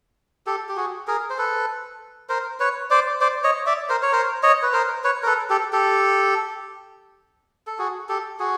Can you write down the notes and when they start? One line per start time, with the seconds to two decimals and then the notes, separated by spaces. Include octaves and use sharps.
0.47 G4 A4
0.69 G4
0.76 F#4 G#4
1.07 G#4 A#4
1.30 C5
1.38 A4 B4
2.29 A#4 C5
2.60 B4 C#5
2.90 C5 D5
3.21 C5 D5
3.44 C#5 D#5
3.66 D5 E5
3.89 A#4 C5
4.03 C#5
4.12 A#4 C5
4.43 C#5 D#5
4.63 B4
4.73 A#4 C5
5.04 B4 C#5
5.23 A#4
5.27 A4 B4
5.50 G4 A4
5.73 G4 A4
7.67 A4
7.79 F#4 G#4
8.09 G4 A4
8.39 F#4 G#4